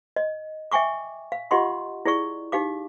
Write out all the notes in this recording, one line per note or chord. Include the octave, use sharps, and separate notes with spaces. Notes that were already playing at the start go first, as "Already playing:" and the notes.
D#5
E5 G5 G#5 C#6 D6
F5
F4 G4 D#5 F#5 C6 C#6
E4 G#4 D5 C#6
D#4 G4 F5 D6